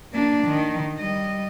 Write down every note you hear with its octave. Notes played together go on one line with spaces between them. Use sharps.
A#3 D4
D#3
G3 D#5